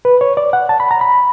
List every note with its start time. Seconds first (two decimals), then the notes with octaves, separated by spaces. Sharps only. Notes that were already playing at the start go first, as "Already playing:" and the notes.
0.05 B4
0.21 C#5
0.37 D5
0.53 F#5
0.69 A5
0.80 B5
0.91 A#5
1.01 B5